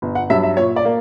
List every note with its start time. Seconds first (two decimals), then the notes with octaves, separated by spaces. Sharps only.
0.02 G1
0.15 F#5
0.30 G2 F#3 E5
0.43 E5
0.57 A#2 C#5
0.76 D5
0.85 A#3